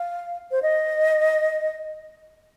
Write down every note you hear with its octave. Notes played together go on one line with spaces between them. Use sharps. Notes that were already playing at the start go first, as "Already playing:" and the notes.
Already playing: F5
C5
D#5